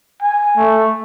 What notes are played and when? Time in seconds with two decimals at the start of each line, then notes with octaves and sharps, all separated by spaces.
0.22 G#5
0.57 A3